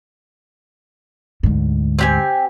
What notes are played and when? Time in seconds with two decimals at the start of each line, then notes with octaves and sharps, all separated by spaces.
1.43 D2 G#2
1.99 C4 G4 G#5